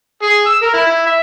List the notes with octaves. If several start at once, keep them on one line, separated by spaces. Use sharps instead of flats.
G#4
E6
A#4
E4
E4
E5